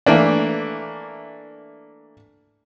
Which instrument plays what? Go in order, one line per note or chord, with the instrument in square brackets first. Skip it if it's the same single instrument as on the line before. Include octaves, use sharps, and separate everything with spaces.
[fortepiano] E3 A3 A#3 D4